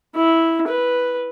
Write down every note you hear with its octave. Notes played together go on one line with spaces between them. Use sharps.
E4
B4